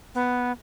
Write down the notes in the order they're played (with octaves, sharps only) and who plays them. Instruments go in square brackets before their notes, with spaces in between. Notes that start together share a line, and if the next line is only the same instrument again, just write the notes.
[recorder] B3